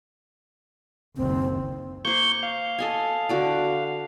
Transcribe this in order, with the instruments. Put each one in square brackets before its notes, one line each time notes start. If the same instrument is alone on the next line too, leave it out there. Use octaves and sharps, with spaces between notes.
[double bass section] F#1 D#2 [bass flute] C4
[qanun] A#3 C5 [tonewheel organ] C#6 G6
[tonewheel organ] F5
[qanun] A4 D#5 G#5
D3 F#4 D5